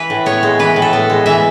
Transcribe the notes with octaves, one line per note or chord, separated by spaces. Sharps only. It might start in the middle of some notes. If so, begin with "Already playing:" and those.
Already playing: E3 B4
A2
B3 C#5
G#3
E3 B4
A2
A4
B3
G#3
E3 E5